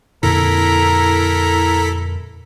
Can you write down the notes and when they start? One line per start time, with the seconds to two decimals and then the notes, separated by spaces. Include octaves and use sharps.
0.23 F2 A#2 D3 E4 A4 A#4 A#5 B6